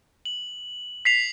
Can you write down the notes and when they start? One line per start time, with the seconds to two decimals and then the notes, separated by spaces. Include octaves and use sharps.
0.25 F#7
1.05 B6 C7 F7